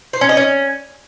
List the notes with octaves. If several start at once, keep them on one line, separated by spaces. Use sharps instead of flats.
C5
C#4
D#5
C#4